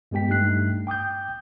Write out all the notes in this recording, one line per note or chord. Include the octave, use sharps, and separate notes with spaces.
G2 G#3 B3 G4 G5 B6
G2 A3 D#4 F#6 C7
G5 D6 D#6 G6